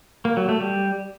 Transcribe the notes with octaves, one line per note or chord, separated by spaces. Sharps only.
A#3
F#3
A3
G3